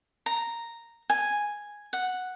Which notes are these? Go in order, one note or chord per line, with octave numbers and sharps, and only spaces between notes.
A#5
G#5
F#5